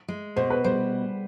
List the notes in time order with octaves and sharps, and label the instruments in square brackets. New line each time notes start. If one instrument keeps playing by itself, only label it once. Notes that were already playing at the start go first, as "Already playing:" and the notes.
[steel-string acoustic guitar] G#3
[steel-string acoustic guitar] B2 [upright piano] C5
[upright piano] B4
[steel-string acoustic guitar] G3 [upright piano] C5